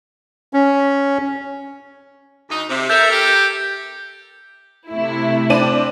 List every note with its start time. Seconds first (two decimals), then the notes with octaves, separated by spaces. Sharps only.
0.53 C#4
2.49 D2 D#4
2.69 C3
2.90 A4 A#4 E5 G6
3.11 G4
4.89 C3 A3 E4
5.50 C4 D4 D#7